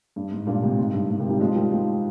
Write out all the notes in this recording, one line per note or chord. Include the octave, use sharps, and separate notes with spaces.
G2
G#2
G2 A#2
G#2 C3
G#2
G2
G#2
C3 D#3
D#3 G3
F3 G#3
D#3 G3
F3 G#3